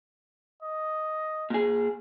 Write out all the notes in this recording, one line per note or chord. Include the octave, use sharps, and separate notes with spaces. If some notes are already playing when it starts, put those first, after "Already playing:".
D#5
A#2 G#4